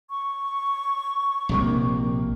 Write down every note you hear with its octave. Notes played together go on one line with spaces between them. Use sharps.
C#6
A#1 C3 A#3